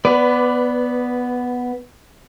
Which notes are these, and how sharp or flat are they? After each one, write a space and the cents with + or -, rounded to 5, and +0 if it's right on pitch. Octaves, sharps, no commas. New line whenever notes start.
B3 +0 B4 +20 D5 +0